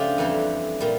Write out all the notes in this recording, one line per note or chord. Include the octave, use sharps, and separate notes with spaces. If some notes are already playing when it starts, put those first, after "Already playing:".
Already playing: C#3 F3 A3 D4 F4 G4
F2 E3 G3
A#2 G3